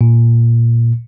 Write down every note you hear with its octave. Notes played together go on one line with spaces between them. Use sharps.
A#2